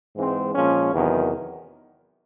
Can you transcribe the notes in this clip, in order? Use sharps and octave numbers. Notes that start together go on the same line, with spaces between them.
G#2 E3 G#3 C4
A#2 F3 G#3 C#4
E2 C3 D#3 F#3